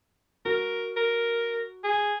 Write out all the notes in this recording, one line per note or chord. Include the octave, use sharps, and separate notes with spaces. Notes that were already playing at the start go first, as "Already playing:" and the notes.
F#4 A#4
A#4
G#4